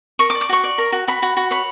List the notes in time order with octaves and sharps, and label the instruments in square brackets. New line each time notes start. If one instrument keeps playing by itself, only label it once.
[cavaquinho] A#4 C#6
D6
D5
D6
F#4 C#6
D5
A#4
F#4
F#4 B5
F#4
F#4
C#5 B5